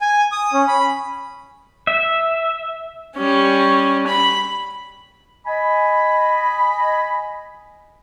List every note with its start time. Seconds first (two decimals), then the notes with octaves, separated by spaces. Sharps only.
0.01 G#5
0.32 D#6
0.53 C#4
0.68 B5
1.87 E5
3.17 G3 C#4
4.07 B5
5.46 D#5 G#5 B5